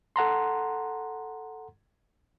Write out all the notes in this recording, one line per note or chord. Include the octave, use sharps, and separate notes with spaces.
A4 F#5 A#5 C6